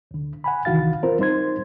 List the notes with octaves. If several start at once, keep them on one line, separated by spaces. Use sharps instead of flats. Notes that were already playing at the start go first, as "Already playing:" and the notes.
D2 D3
F#5 G#5 B5
C2 D#3 E3 F#4 F5 A6
C4 F4 A#4 C5
G3 D#4 C5 C6 G#6